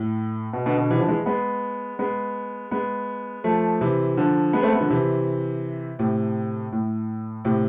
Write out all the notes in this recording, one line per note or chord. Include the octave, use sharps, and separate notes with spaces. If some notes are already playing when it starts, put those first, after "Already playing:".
Already playing: A2
B2
B2 D3
B2 D3
C3 E3
D3 F3
E3 G#3
G#3 B3
G#3 B3
G#3 B3
F3 A3
C3 E3
D3 F3
G#3 B3
A3 C4
G#3 B3
D3 F3
C3 E3
A2 C3
A2
A2 C3